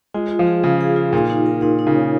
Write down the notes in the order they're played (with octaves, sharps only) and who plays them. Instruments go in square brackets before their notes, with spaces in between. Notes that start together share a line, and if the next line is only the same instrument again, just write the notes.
[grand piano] G#3 [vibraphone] F4
[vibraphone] F4
[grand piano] F3
[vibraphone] G#4
[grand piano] C#3 [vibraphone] G#4
[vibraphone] G#4
F4
[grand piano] A#2 [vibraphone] D#4
[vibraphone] D#4
A#4
[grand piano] A#2 [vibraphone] D#4
[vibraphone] D#4
[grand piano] C#3
[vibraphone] C#5